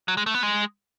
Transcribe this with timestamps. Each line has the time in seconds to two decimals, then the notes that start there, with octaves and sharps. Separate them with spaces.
0.08 F#3
0.17 G#3
0.26 A3
0.34 B3
0.43 G#3